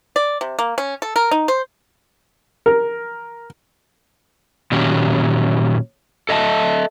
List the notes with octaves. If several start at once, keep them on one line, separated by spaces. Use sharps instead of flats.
D5
C3
A#3
C#4
A4
A#4
D#4
C5
A#4
A#2 D#3 F#3 C#4 G4
A4 D#5 E5 A5